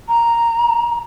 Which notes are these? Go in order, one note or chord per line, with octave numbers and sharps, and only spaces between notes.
A#5